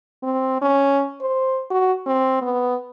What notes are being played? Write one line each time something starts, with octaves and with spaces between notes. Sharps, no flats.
C4
C#4
C5
F#4
C4
B3